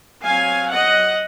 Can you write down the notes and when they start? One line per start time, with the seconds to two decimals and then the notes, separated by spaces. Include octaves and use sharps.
0.24 F#3 C4 F5 G#5
0.71 D#5 F#5